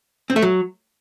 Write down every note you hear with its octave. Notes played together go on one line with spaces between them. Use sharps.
C4
A3
F#3